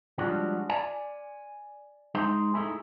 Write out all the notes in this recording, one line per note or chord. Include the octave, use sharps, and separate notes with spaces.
F3 G3 G#3 C#4 D4 F#4
D5 G#5
G#3 D#4 C5
A3 D#4 E4 G#4